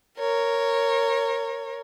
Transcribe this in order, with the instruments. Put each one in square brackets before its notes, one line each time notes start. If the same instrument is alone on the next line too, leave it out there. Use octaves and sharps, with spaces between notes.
[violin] A#4 C#5